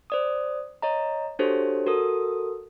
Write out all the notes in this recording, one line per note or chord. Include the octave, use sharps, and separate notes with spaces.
C5 D5 D#6
C#5 D#5 A#5
D4 F#4 G4 A4 C5 C#5
F#4 A4 A#4 D#6